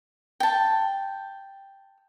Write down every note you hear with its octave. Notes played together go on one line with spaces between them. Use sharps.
G5 A5